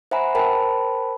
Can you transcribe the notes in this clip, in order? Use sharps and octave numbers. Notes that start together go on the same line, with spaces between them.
C5 E5 F#5 G#5 A#5 B5
A#4 C5 G5 A5 B5